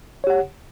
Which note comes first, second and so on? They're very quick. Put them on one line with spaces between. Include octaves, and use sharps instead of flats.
C#5 G4 F#5